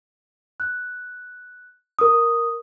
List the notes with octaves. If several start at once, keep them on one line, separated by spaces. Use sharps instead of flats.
F#6
A#4 D#6